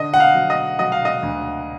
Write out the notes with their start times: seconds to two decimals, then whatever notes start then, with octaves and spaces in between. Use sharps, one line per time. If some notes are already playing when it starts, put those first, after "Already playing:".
Already playing: D3 D#5
0.14 F#5
0.20 F5
0.35 F#3
0.50 D#5
0.79 F#3 D#5
0.92 F5
1.05 D#5
1.23 D2